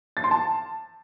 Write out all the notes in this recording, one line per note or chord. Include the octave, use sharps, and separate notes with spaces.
A6
C6
A5